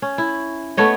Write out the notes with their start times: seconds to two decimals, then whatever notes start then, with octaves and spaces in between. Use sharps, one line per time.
0.02 C#4
0.18 E4
0.77 A3 B3 C#5 D#5